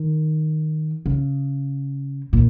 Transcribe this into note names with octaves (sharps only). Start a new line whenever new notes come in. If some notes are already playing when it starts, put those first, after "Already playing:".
Already playing: D#3
C#3
A#2